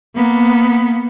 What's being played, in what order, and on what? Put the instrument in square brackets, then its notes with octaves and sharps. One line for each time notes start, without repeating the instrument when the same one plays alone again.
[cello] A#3 B3